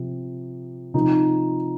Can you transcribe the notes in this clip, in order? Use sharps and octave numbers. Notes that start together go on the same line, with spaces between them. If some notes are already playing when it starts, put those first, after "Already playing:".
Already playing: C3 F3
C3 F3 D#4